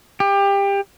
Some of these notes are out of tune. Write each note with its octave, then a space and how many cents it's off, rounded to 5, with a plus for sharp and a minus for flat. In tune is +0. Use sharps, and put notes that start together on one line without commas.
G4 +25